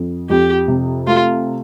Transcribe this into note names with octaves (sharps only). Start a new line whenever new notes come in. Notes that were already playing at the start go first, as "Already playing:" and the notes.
Already playing: F2
F2 G4
C3
A3 F4